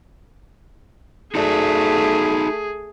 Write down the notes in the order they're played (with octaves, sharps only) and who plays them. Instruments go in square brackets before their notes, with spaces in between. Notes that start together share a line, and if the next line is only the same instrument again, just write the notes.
[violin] A3 [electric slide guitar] D#4 F#4 D5 [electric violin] G#4